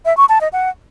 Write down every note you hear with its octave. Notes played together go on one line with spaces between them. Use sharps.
E5
C#6
A5
D#5
F#5